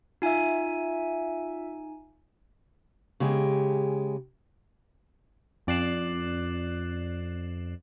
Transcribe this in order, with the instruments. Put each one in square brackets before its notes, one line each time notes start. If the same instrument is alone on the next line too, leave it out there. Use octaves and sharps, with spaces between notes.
[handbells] D#4 G#5 [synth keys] F4 E5
[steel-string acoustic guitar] C#3 G#3 G4
[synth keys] F2 D5 F#6 C7 E7